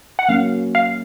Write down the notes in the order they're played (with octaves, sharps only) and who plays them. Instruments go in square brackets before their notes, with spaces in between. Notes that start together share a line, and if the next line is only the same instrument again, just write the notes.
[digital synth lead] F#5
[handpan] F#3 A#3 C#4 [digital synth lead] F5
[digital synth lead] F5